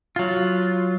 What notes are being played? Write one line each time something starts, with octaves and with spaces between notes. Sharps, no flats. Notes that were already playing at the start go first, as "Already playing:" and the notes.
F#3 F4